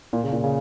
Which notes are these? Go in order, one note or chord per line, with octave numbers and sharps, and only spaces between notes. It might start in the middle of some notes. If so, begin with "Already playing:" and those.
A#2
C#3
A#2
C#3